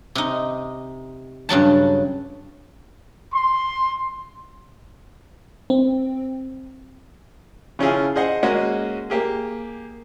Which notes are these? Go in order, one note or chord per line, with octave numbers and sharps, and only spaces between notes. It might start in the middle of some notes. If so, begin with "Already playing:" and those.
C3 D#4
G2 C#3 F#3 A5
C6
C4
C#3 F3 C#4 E4 F4 G#4
G#4 C5 D#5 F#5
G#3 A#3 C#4 F#4 D#5
A#3 G4 G#4